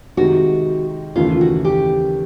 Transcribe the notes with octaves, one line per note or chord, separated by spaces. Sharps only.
C3 D#3 G#3 F#4
D#2 C#3 E3 A3 F4
F#4
G4